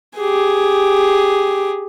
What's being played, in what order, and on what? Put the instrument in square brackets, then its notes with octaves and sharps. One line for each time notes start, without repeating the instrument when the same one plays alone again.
[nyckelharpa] G4 G#4